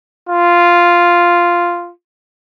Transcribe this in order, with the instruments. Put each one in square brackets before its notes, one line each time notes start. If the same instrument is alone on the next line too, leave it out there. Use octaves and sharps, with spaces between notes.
[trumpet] F4